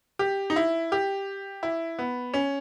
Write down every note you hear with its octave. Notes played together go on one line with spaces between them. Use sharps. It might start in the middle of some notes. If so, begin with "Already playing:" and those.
G4
D#4
E4
G4
E4
B3
C#4